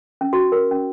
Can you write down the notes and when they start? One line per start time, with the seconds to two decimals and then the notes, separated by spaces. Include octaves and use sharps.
0.21 C#4
0.33 F#4
0.52 A#4
0.71 C#4